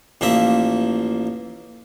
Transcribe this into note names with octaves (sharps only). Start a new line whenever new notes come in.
A1 F3 A#3 E5